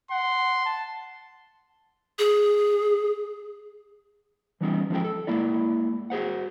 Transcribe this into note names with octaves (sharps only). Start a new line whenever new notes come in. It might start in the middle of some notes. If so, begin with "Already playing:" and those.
F#5 C6
A5
G#4
E3 G3 B3 C#4 D#4
F3 G#3 C#4 A4 G5
A4
G#3 A#3 E4 D5
F#4 G#4 C5 F#5